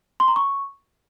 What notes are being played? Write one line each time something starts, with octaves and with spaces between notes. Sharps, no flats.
C6
A#5
C#6